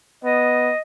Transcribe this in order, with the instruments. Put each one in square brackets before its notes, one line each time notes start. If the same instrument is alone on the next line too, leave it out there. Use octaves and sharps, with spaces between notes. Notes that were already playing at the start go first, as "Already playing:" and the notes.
[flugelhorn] B3 [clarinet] D#5